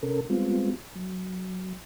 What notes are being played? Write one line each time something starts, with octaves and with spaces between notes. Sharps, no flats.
C3 C#4 A4 A#4
G3 G#3 B3 C4 F4
F#3